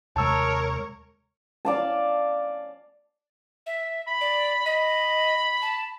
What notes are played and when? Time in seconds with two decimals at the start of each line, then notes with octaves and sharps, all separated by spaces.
0.16 D#2 C3 G#3 A#4 C#5 A5 E6
1.65 D5 F5 A5
3.66 E5
4.07 B5
4.21 D5
4.66 D#5 B5
5.62 A5